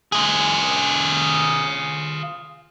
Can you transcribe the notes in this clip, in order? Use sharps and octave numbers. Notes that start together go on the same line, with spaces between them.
F4 G#4